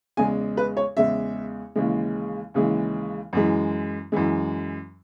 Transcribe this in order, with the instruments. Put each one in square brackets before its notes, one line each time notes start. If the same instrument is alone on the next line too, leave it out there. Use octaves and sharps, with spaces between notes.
[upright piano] E2 C#3 G#3 G#5
B4
C#5
E2 C#3 G#3 E5
D#2 C#3 E3 G#3
D#2 C#3 E3 G#3
F#2 E3 G#3
F#2 E3 G#3